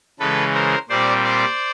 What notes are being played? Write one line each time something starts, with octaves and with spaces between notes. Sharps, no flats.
C#3 E3 G#3 A4 B4
A#4 C5
A#2 G3 C4 C5 D5
C5 D5